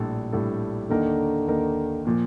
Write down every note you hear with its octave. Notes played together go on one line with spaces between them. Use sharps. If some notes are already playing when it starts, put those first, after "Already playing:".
Already playing: A#1 A2 G3 D4 A4
A#1 A2 G3 D4 A4
D#2 D3 D#3 A#3 D#4 A#4
D#2 D#3 A#3 D#4 A#4
A#2 F3 A#3